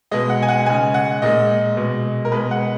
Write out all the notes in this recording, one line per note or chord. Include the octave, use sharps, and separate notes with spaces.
B2 G#3 D#5
F#5
G#5
F#5
C#3 G#3 G#5
F#5
A#2 G#3 D#5
B2 G#3
A#4
B2 G#3 B4
F#5